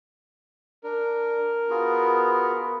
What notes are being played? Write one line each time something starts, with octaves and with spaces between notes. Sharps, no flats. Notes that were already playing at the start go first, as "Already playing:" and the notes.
D4 A#4
B3 F4 F#4 G#4